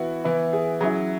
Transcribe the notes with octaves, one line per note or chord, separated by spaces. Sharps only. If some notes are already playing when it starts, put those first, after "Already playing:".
Already playing: E3 B3 E4 F#4
E3 B3 E4
G#4
F#3 C#4 E4 G#4